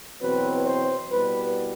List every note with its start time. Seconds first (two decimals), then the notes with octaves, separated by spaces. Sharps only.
0.21 E2 B2 F#3 C4 B4
0.66 C5
1.11 C2 B2 G3 B3 B4